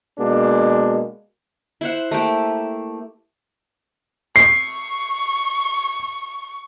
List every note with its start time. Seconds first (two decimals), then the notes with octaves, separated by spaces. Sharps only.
0.19 B2 G#3 A#3 D4
1.81 E4 C5 F#5
2.11 A3 A#3 G4
4.36 C#6 C7